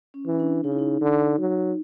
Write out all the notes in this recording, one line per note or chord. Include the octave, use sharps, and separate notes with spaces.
C#4
E3
C#4
D4
C#3 D#4
E4
D#4
D3
F#3